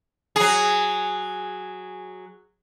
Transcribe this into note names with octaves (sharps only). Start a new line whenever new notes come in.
F#3 G#4